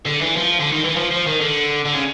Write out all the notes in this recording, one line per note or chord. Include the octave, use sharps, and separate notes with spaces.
D3
E3
F3
D3
D#3
E3
F3
F3
D#3
D3
D3
C#3